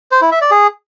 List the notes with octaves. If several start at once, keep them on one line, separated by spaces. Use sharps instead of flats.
C5
E4
E5
D5
G#4